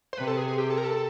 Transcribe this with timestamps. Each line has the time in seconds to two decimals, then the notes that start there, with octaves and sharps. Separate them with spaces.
0.13 C5
0.17 C3 B4
0.27 A4
0.37 G#4
0.48 G#4
0.58 G4
0.70 A4
0.78 A#4
0.85 A4